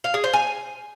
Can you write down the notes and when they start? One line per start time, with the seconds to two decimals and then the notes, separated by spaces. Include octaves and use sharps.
0.04 F5
0.14 G#4
0.24 C5
0.33 G#5